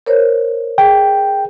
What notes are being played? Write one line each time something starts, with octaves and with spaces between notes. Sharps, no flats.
A#4 C5 C#5
G#4 G5